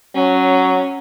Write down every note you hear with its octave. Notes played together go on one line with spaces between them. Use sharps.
F#3 C#4